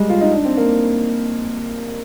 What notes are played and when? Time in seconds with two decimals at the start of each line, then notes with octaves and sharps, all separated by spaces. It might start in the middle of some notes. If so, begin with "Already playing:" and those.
Already playing: G3 G#3
0.09 F4
0.21 D#4
0.33 D4
0.45 C4
0.57 A#3